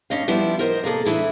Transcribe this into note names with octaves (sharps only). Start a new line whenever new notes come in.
G2 C#4 D#5 F5
F3 G3 B3 E4
A#4 C5 D#5
C3 A#3 G#4 A4
D2 G#2 E3 E4 G#4